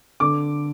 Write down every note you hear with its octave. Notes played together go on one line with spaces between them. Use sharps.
D3 D6